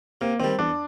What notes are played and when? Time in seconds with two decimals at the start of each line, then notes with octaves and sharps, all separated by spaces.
0.21 C3 A#3
0.40 D#3 G3 C4
0.59 E2 D4